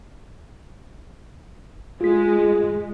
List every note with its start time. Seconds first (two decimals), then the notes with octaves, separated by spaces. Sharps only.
2.01 G#3 F4 B6